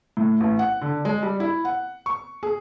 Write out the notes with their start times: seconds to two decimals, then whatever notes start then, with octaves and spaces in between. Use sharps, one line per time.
0.17 A2
0.40 A1
0.59 F#5
0.82 D3
1.05 G#3
1.23 G3
1.40 E4
1.65 F#5
2.06 C#6
2.43 G#4